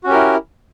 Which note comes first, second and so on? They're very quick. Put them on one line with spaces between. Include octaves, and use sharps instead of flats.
F#4 C#4 G4 A#4 E4